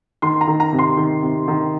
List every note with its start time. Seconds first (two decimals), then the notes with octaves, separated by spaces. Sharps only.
0.22 D#3 C6
0.41 A#5
0.48 D#3
0.60 A#5
0.73 C3
0.79 C6
0.97 D#3
1.22 C3
1.48 D#3